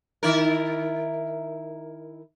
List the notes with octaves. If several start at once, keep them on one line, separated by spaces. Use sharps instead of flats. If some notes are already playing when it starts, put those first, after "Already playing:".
D#3 E4 A#4